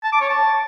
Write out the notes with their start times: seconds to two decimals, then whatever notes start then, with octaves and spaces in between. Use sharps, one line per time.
0.04 A5
0.13 D6
0.21 C#5
0.30 A5